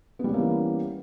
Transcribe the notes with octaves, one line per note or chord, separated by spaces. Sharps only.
E3 G3 A#3 B3 C#4